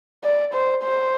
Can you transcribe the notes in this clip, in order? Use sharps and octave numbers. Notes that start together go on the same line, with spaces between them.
D5
C5
C5